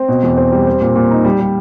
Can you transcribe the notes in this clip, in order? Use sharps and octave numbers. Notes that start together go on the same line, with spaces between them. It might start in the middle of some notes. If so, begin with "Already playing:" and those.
Already playing: C4
B2
E2
C4
G3
C4
A#2
A#2
D#4
G3
G3